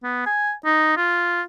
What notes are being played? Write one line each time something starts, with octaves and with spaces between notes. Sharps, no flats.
B3
G#5
D#4
F4